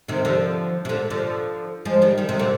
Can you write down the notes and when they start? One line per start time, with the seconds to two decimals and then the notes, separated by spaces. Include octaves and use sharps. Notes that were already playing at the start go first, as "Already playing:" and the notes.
0.08 C3 D#3
0.25 D3 F3
0.85 C3
0.89 A#2 D3
1.10 D3 F3
1.85 F3 G#3
2.02 D#3 G3
2.18 D#3 G3
2.29 C3 D#3
2.39 A#2 D3